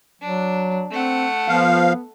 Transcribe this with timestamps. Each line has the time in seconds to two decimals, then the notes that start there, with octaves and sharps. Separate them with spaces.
0.21 F#3 D4
0.91 A3 C4 F#5
1.48 F3 B3 F5